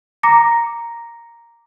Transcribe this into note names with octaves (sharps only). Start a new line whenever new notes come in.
A#5 D6 A#6 C#7